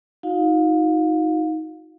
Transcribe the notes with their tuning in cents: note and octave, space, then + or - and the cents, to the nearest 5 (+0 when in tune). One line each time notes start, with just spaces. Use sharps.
D#4 +20 F#4 -35 F5 +30